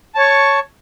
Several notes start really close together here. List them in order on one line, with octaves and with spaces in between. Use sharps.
A5 C#5 C#6